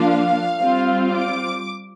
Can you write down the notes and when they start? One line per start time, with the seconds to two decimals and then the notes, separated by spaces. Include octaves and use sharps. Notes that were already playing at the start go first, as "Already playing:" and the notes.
Already playing: F3 A#3 D4 F4 F5
0.58 G3 C4 F4
1.12 D6